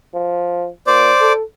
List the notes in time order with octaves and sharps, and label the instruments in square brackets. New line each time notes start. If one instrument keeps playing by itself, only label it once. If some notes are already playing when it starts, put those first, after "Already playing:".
[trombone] F3
[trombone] A#2 [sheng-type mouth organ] C5 D5 D6
[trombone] A4